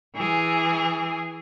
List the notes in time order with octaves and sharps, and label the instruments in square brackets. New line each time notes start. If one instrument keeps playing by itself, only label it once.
[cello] E3 G#4